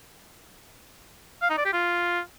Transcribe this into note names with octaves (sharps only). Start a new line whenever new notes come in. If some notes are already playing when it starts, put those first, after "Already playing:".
F5
D#4
D5
G4
F4